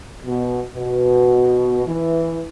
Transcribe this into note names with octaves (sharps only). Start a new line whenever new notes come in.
B2
B2
E3